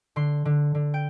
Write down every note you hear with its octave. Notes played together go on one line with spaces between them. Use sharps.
D3 C6
D3
D3
G5